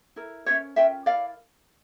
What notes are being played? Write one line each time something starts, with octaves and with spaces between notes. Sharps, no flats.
E4 A#4
C#4 F4 A#4 C#5 E5
C#4 F4 A#4 E5 G5
E4 A#4 D5 F5